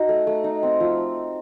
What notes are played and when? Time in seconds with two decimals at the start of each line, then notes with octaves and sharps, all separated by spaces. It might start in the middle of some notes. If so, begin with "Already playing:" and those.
Already playing: D#4 F#4
0.09 A3
0.27 A3
0.44 D#4
0.63 C4
0.80 F3